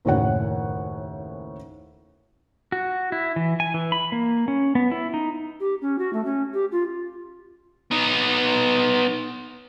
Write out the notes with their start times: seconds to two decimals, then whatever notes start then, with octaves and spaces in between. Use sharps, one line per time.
0.05 F#1 D#2 A2 F#4 C#5 F#5
2.72 F#4
3.12 E4
3.36 E3
3.60 G#5
3.74 E3
3.92 B5
4.12 A#3
4.48 C#4
4.75 B3
4.91 E4
5.14 D#4
5.60 G4
5.82 C#4
5.99 F#4
6.13 A3
6.25 C#4
6.54 G4
6.72 F4
7.91 B3 D#4